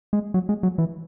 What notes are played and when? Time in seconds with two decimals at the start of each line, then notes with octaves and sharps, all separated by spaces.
0.13 G#3
0.34 F#3
0.49 G#3
0.63 F#3
0.78 E3